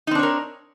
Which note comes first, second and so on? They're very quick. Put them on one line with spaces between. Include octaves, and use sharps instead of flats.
D#4 C4 D4 C#5 A#4